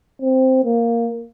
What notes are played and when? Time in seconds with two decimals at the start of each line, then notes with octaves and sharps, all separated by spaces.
0.22 C4
0.65 A#3